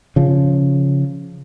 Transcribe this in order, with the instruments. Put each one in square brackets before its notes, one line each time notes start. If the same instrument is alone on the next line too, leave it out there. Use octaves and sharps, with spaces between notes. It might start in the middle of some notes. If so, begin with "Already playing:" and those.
[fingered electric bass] C#3 F3